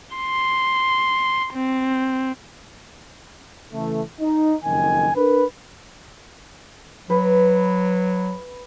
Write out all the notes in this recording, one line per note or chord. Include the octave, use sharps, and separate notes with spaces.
C6
C4
C#3 E3 A3
D#4
F#1 F2 D#3 G#5
D4 A#4 B4
F#3 B4